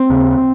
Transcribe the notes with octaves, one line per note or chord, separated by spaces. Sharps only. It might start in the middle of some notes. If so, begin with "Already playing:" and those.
Already playing: C4
D#2 C#3